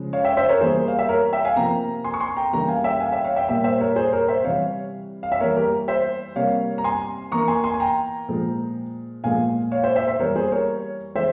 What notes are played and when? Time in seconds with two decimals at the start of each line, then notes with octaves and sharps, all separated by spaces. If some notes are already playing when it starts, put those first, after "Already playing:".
Already playing: C#3 F3 G#3
0.13 C#5 F5
0.25 E5 G5
0.37 C5 E5
0.49 A#4 C#5
0.61 E3 G3 A#3 G#4 C5
0.88 F5
0.99 E5
1.09 A#4 C#5
1.33 E5 G5
1.45 F5 G#5
1.56 C3 F3 A#3 G5 A#5
2.04 G#5 C6
2.14 C#6
2.20 G#5 C6
2.37 G5 A#5
2.53 C#3 E3 G3 A#3 G5 A#5
2.68 F5 G#5
2.84 E5 G5
3.00 F5 G#5
3.13 E5 G5
3.24 C#5 F5
3.36 E5 G5
3.49 A#2 G3 A#3 E5 G5
3.64 C5 E5
3.80 A#4 C#5
3.96 G#4 C5
4.12 A#4 C#5
4.28 C5 E5
4.44 C3 E3 G3 C#5 F5
5.23 F5
5.32 E5
5.40 E3 G3 A#3 A#4 C#5
5.57 G4 A#4
5.88 C5 E5
6.36 C3 G3 A#3 C#5 F5
6.78 A#5
6.84 G#5 C6
7.32 E3 A#3 A#5 C#6
7.48 G#5 C6
7.64 G#5 C6
7.74 G#5
7.80 G5 A#5
8.28 A#2 F3 G#3
9.24 A#2 F3 G#3 F5 G#5
9.72 C#5 F5
9.84 C5 E5
9.95 C5 E5
10.07 C5 E5
10.19 E3 G3 A#3 A#4 C#5
10.35 G#4 C5
10.52 A#4 C#5
11.15 E3 G#3 C5 E5